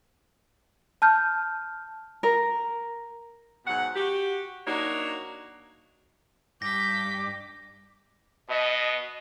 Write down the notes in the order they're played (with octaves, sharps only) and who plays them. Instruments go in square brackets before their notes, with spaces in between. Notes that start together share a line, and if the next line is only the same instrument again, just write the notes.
[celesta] A5 F6 G6
[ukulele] A#4
[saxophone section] G#2 B2 F#3 F#5
F#4 G4
F#3 A#3 D4 D#4 F#4 C#5
[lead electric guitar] G2 [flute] D6 [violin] G6 B6 [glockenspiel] A#6
[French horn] B2 [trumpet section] D#5